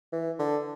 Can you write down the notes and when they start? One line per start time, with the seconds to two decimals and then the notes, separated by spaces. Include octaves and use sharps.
0.13 E3
0.39 D3